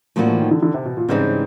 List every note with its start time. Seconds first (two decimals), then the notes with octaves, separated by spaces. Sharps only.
0.16 A2 F3 F#3 A#3 D4 F#4
0.28 E3
0.40 D#3
0.51 D3
0.63 D3
0.74 C3
0.85 B2
0.97 A#2
1.09 G#2 C#3 E3 G3 C4 D#4